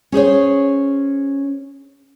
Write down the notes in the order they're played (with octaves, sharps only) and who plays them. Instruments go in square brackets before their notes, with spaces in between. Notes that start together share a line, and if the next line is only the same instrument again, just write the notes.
[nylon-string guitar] C#4 G#4 C5 C#5